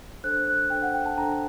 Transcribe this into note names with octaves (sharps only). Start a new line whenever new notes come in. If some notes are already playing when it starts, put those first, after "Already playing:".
D4 A4 C5 F#6
F#6
D4 A4 C5 G5
F#5
G5
A5
D4 A4 C5 A#5